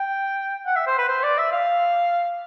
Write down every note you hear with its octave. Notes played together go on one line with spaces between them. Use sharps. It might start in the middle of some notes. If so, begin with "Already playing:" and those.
Already playing: G5
F#5
E5
C5
B4
C5
D5
E5
F5